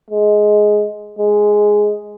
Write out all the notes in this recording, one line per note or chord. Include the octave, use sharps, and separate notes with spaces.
G#3
G#3